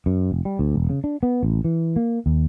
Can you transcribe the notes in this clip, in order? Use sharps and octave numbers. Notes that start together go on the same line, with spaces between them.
F#2
F1
G3
D2
E1
C#3
D4
B3
A1
E3
A#3
D#2